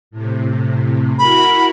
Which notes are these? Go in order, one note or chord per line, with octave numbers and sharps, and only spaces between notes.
A2 C3
E4 F#4 A#4 B5